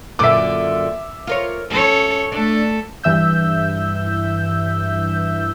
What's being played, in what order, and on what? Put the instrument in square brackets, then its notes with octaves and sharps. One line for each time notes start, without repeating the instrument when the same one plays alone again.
[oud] F#2 A#2 D3 [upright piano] E5 D6
[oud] F4 A#4 C#5
[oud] C#4 [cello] A4 C#5
[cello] A3 A4 [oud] D4
[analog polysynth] G2 E3 E5 E6 G6